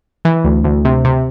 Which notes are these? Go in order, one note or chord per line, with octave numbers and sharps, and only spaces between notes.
E3
D2
D2
C3
C3